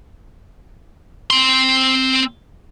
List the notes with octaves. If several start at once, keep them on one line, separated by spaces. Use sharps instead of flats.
C4 C6